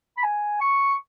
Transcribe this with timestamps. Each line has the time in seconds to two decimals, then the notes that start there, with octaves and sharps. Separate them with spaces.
0.17 B5
0.23 G#5
0.61 C#6